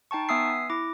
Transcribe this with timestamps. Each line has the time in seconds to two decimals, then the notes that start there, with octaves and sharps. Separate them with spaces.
0.11 D#4 G5 A5 C#6
0.29 B3 E5 G#5 D#6 E6 C7
0.70 E4 D6